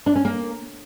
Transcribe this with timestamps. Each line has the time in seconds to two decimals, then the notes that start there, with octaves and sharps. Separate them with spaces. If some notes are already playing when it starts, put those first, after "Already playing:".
0.06 D4
0.15 C#4
0.25 A#3